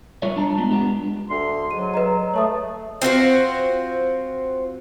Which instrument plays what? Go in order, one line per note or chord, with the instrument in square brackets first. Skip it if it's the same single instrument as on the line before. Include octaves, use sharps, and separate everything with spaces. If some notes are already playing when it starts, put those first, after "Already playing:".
[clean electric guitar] G3 F4 A#4 C#5 D5 E5
D4 A5 A#5
G#3 B3 F4
G#3 B3 D4 G4
[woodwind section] D2 C6
[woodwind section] G#2 F#3 [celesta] D#7
[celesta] B4 D#5 A#5
[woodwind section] A3 [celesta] C#5 A5 D#6
[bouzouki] C4 F4 F#4 C5